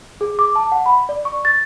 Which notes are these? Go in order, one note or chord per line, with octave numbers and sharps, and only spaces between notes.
G#4
D6
A5
F#5
B5
D5
C#6
A6